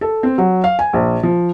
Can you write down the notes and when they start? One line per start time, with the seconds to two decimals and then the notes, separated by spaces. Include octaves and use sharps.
0.01 A4
0.23 C4
0.38 F#3
0.64 F5
0.79 G#5
0.93 A#1
1.23 F3